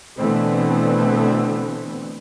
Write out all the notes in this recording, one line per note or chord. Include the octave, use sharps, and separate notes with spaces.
B2 D3 E3 A3 B3 C4